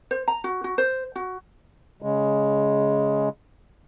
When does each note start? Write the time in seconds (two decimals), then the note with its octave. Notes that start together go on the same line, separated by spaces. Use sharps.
0.11 C5
0.28 A#5
0.44 F#4
0.64 F#4
0.78 C5
1.16 F#4
2.02 C#3 G#3